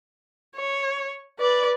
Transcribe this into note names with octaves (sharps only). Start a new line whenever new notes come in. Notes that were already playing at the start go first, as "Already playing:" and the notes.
C#5
B4 D5